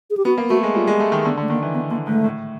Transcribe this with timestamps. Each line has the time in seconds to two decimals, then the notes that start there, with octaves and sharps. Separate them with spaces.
0.10 G#4
0.17 G4
0.25 B3 F#4
0.38 A#3
0.50 A3 F#4
0.63 G#3
0.75 G3 F4
0.87 G#3
1.00 A3
1.12 D#3
1.24 D3 B3
1.37 D3
1.42 A3
1.49 D#3 A#3
1.62 E3
1.74 D#3 B3
1.90 D3 A#3
2.07 G#2 A3
2.24 A2